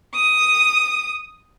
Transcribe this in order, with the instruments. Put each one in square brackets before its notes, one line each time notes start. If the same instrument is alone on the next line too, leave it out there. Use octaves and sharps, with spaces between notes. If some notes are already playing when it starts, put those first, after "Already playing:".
[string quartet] D#6